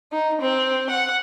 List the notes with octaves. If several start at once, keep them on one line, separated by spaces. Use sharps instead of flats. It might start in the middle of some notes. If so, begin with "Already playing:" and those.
D#4
C4
F#5